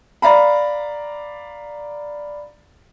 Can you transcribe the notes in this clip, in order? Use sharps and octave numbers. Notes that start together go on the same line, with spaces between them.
D5 F5 A#5 B5